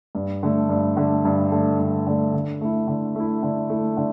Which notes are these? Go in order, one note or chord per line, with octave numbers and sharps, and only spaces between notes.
G2
D3 A3
G2
D3 A3
G2
D3 A3
G2
D3 A3
D3
A3 E4
D3
A3 E4
D3
A3 E4
D3